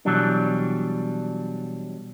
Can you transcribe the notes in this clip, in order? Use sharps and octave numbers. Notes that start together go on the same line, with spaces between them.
B2 E3 F#3 G3 D4